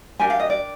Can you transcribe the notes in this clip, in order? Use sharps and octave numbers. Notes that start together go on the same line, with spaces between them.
D4 G4 A#4 G#5
F5
D#5
D5